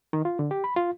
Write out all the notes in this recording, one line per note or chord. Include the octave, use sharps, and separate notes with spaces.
D#3
F4
D3
G4
B5
F4